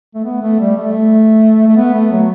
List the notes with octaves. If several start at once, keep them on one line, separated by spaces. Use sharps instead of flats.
A3
B3
A3
G3
A3
A3
B3
A3
F#3